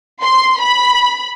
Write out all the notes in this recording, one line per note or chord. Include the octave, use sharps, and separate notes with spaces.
C6
B5